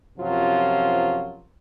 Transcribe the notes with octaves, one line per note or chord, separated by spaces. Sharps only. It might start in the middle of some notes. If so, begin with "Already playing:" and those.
F#2 C3 F3 F#3 F4